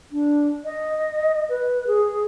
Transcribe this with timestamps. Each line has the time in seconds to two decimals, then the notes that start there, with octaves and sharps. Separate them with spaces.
0.12 D4
0.65 D#5
1.49 B4
1.87 G#4